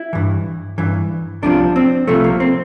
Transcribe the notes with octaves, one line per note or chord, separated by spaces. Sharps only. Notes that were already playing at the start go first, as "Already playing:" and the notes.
Already playing: E4
G2 E3
G2 E3
C2 C3 F3 D4
C4
C2 C3 F3 A3
A#3
C4